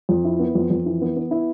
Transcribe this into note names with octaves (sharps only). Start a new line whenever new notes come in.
F2
E4
B3
F2
F2
E3
B3
B3
E4